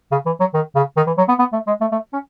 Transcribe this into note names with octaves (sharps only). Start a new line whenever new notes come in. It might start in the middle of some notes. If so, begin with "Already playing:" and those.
C#3
E3
F#3
D#3
C#3
D#3
E3
F#3
B3
B3
A3
G#3
A3
A3
C#4